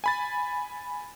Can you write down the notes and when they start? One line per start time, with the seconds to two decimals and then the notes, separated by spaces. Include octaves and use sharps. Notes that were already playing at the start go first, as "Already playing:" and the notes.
0.04 G#5 B5 A6